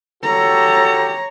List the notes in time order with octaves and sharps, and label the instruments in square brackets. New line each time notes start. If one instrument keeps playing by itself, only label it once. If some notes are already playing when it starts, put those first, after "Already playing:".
[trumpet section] F#4 G4 A4 [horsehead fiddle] C#5 A#5